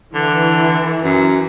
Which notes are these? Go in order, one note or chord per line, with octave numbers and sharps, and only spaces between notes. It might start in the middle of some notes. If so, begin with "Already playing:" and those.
D3 E3
F#2